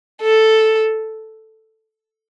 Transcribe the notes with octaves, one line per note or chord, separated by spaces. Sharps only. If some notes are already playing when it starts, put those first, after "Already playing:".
A4